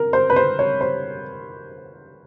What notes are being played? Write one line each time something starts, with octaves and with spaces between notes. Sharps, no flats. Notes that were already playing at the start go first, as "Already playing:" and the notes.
Already playing: A#4
C5
B4
C5
C#5
C5